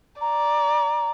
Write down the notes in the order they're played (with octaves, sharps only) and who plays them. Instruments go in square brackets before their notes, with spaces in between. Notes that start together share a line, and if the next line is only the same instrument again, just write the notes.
[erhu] D5 [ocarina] A#5